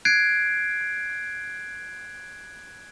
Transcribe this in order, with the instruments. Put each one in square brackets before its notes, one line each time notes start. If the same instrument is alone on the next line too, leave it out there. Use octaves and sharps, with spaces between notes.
[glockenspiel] F#6 G#6 C7 D7